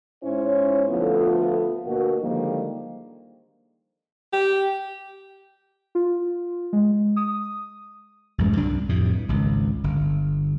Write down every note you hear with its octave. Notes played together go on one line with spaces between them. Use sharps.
G#2 C#4 E4 C5 C#5
D2 F3 A3 B3 F4 A4
D2 B2 A#3 F#4
D3 D#3 F3 G3 G#3 A#3
G4
F4
G#3
D#6
A1 F#2 G#3
C2 G2 D4
F2 A2 C3
G2
G#1 C#2
G1